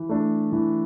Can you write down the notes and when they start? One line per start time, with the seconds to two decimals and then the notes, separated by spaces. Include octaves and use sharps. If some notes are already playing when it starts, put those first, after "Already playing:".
Already playing: E3
0.09 A3 D4
0.52 E3